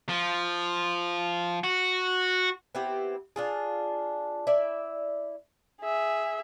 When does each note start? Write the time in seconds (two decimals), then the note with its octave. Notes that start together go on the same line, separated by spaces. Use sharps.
0.09 F3
1.64 F#4
2.75 B3 C4 E4 G4
3.36 D4 F4 G#4
4.47 E4 D5 E5
5.81 G#4 E5